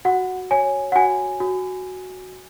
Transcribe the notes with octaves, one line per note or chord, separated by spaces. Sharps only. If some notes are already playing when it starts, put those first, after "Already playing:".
F#4 F#5
C#5 G#5
F#5
F#4 G#5
F#4